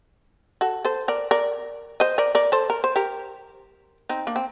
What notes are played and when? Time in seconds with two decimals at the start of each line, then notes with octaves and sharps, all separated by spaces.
0.61 F#4 A4
0.85 A4 C5
1.08 A#4 D5
1.31 A#4 D5
2.00 C5 D#5
2.18 A#4 D5
2.35 A#4 D5
2.52 A4 C5
2.70 A#4
2.84 C5
2.96 G4 A#4
4.09 C4 D#4
4.27 A#3 D4
4.36 C4